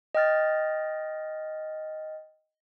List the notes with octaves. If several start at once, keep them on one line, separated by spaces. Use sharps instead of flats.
D#5 G5 F6 A6